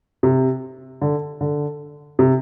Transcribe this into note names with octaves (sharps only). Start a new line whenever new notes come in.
C3
D3
D3
C3